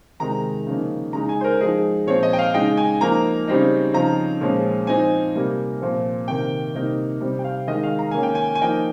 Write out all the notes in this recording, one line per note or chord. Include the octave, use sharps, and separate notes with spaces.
C3 D#3 G#3 D#4 A#5
C#3 F3 A#3 D#4
C#3 G#3 D#4 A#5
G#5
C5
A#4
F3 G#3 D#4 G#4
A#2 F3 C4 C#5
D#5
G5
F5
C#3 G#3 D#4 G5
G#5
F3 A#3 D#4 A#5
C#3 G3 C4 D#4
C#3 F3 C4 D#4 A#5
A#2 F3 G#3 C#4
F3 C4 D#4 G#5
C3 G3 A#3
A#2 F3 C4
C3 D#3 A#3 G5
C3 G3 A#3 D#4
C3 G3 C4
G5
F5
D#3 G#3 D#4 D#5
F5
A#5
D#3 A#3 C#4 G#5
G5
G#5
G#5
F3 A#3 D#4 G5